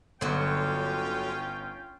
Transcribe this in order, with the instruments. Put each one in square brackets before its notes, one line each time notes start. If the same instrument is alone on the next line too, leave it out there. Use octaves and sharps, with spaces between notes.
[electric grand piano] G1 [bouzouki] D3 F#3 [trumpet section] C#4 F4 G5